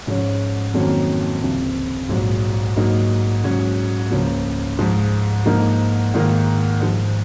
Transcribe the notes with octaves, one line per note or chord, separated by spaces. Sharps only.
G#2 F3 G#3 C#4
F2 D#3 F#3 A#3 C#4
C#2 C3 F3
A#1 G#2 F#3
G#2 F#3 A#3 D#4
G#2 F#3 C#4 G#4 C#5
C#2 C#3 F3 A#3
G#2 F3 G#3
G#2 F3 A#3 D#4 A#4
G#2 D#3 A#3 F4 A#4
G#2 F3 G#3